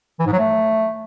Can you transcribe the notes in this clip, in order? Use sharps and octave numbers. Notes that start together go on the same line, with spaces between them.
E3
G#2
F#3
A3